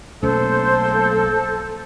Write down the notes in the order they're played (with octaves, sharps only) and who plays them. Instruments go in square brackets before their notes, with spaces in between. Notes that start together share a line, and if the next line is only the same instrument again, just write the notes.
[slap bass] B1 A3 C#4 [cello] A#3 [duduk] A4 [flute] C5